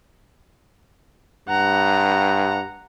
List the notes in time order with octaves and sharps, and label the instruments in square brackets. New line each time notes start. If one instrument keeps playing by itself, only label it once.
[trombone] G2 [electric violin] F#5 A#5